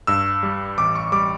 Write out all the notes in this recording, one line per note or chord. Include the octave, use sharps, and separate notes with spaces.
G2 E6
G3
A1 D6
C#6
G3 D6